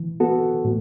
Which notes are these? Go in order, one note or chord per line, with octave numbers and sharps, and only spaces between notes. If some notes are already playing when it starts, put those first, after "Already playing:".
Already playing: E3
B3 F#4 A4
A2